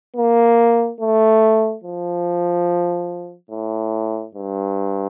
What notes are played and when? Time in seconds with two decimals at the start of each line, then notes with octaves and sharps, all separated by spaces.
0.17 A#3
1.01 A3
1.84 F3
3.51 A2
4.35 G2